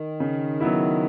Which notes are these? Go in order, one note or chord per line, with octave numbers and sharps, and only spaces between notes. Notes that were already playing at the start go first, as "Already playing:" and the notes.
Already playing: D#3
C#3
F#3 B3 E4